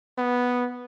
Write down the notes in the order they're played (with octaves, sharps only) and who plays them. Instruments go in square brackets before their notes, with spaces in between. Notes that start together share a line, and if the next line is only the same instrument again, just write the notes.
[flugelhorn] B3